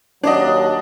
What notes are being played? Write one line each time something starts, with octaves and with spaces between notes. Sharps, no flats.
D#2 F#3 D4 D5 D#5